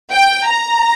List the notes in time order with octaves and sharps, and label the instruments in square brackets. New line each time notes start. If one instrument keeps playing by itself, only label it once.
[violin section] G5
A#5